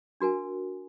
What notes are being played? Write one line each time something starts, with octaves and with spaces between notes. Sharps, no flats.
D4 F#4 A#4 G#5